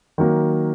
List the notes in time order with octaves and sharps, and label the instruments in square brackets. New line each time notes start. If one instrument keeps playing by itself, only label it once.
[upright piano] D#3 F#3 A#3